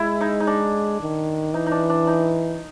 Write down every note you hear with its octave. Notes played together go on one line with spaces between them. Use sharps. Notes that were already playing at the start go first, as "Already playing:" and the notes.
Already playing: G#3 E4
D#4
D#4
D4
D#3
E3 D#4
D#4
D4
D4
D#4